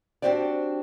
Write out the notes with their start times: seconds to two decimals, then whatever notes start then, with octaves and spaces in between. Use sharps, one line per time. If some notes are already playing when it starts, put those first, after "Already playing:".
0.22 C4 D4 F#4 G4 C5 D5